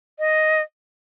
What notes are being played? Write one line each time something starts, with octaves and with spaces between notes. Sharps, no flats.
D#5